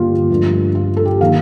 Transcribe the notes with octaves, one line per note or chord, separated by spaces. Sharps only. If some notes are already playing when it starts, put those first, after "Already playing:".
Already playing: G2 D3 G3 A#3 F4 G4
G2 F3 A3
F4
A4
G4
D#3 A#3 F5